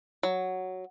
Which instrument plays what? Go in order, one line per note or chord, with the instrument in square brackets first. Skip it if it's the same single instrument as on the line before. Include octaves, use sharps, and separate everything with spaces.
[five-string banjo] F#3